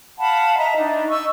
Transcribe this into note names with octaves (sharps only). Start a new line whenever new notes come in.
F5 F#5 A5 B5
D#5 E5 A#5
D4 D#4
D#5 C#6 E6